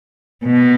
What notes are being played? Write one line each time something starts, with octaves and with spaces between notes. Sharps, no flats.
B2